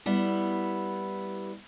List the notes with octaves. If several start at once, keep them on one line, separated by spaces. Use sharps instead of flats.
G3 B3 E4